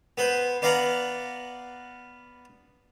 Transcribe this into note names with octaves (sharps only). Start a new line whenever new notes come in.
B3 B4 C5
B3 D5 F5 F#5 A#5